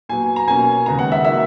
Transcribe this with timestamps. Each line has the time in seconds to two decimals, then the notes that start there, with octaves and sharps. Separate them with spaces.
0.09 A#2 F#3 B3 G#5
0.36 A#5
0.47 B2 A#3 C#4 G#5
0.86 D#2 C#3 G#3 B3 A#5
0.99 F#5
1.12 E5
1.24 D#3 F#3 A#3 E5